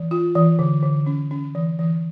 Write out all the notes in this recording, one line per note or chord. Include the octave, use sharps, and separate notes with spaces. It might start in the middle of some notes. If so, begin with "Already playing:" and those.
Already playing: E3
F4
E3
D3
D3
C#4
C#4
E3
E3